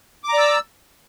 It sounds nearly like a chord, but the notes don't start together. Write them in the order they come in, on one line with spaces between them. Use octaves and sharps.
D6 A#5 D5 E6